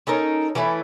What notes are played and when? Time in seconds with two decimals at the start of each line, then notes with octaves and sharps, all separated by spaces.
0.07 C#4 D#4 A4 A#4
0.55 E3 A3 C#4 E4